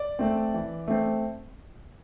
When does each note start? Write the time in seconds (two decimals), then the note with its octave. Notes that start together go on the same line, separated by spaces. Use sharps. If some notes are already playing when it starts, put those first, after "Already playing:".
Already playing: D5
0.19 A3 C4
0.54 E3
0.88 A3 C4